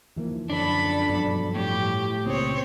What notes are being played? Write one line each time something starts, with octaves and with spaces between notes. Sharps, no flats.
D#2 E3 F3 A#3
F#2 D3 F3 C#4 D4 A4 B5
G2 B2 F#3
A2 G4
C#2 A#2 C4 C#4 C#5 D#6